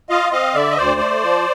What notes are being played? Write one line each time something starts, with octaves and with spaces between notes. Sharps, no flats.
F4 D#5 F5
C4 D#5 F5
D3 D5 E5
D#5
D2 C5 D5
A3
F3